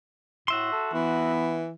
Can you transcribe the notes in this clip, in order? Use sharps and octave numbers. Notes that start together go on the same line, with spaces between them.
A2 F#4 E5 C6
A4
E3 B3